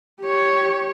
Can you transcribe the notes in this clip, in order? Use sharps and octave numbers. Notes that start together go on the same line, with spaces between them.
G4 C#5